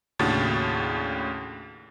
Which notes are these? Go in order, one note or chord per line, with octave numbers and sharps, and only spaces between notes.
D#2 A2 C#3 D4 F#4 A6